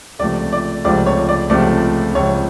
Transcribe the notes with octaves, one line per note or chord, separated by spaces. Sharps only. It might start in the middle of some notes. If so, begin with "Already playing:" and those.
C#2 C3 F3 A3 D5
D5
C#2 C3 F3 A3 D5
C#5
D5
C#2 C3 F3 A3 D5
C#2 C3 F3 A3 C#5